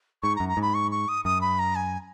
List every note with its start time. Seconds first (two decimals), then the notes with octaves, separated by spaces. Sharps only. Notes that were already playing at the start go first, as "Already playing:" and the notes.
0.23 G#2 C#6
0.36 A#5
0.40 F#2
0.49 A#5
0.57 G#2 B5
0.74 C#6
0.91 C#6
1.09 D#6
1.25 F#2 D#6
1.41 B5
1.59 A#5
1.76 G#5